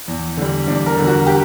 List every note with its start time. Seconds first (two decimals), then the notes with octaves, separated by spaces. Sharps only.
0.08 E2
0.37 D3 G3
0.67 E2 D4
0.86 A#4
0.97 D3 G3
1.07 F#4
1.27 G4